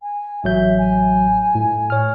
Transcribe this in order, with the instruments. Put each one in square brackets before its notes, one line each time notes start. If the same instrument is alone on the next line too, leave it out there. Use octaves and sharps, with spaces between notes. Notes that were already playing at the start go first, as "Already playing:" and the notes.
[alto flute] G#5
[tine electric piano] A1 F#3 G6 [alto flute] E5
[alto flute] G#5
[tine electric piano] A2
C#5 F6